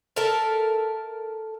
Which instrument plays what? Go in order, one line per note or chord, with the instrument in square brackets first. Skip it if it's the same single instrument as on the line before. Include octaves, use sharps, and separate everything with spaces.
[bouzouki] A4 A#4 E5 A5